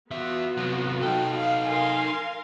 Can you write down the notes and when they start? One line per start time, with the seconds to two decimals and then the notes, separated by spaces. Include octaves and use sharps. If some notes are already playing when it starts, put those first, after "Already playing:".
0.11 E2 B3 F4 F#4 E5
0.57 C3 F#3
1.02 D#4 A4 G5
1.36 F5
1.67 A#4 F5 G#5 C6